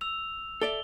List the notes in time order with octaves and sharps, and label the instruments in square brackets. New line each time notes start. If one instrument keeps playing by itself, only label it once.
[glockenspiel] E6 F7
[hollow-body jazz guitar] A4 D5 E5 [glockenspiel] G7